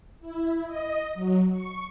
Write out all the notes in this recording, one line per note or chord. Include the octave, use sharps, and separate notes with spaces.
E4
D#5
F#3
C#6